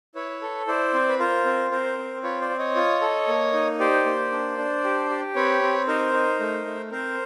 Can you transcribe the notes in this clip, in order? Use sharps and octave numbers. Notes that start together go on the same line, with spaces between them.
E4 B4 C#5
A4
E4 C5 D5
C4
B4
F4 A#4 C5
C4
C4 A#4 C5
C4
F4 B4 C#5
C5 D5
C4
C#5 D#5
F4
A4
A#3
D#4
G4 C5 D5
A#3
D4
D4
G4
G4
C4 B4 C#5
C4
D#4 A#4 C5
D#4
A3
A3
C4 A#4 C5